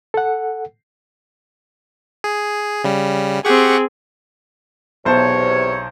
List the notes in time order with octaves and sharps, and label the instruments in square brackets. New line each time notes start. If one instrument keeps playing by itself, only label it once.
[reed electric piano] A4 F#5
[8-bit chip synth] G#4
C#3 G3
[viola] C4 G#4 [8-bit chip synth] G4 F#5 C#6
[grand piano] B1 C5 A5 [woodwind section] E2 C3 C#5